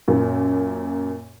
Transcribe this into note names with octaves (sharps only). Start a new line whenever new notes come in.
F#2 A#2